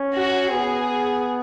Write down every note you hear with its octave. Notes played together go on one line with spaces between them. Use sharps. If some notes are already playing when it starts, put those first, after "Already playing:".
Already playing: C#4
F#4
B3 G#4